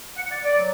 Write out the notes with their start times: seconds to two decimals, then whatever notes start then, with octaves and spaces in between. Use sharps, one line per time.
0.17 F#5
0.31 D5
0.44 D5
0.58 F#3